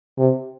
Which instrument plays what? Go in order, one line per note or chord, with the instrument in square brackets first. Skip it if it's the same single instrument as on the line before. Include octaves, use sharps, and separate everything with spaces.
[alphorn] C3